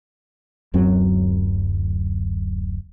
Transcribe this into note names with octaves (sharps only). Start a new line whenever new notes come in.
D1 F#2 F#3 C4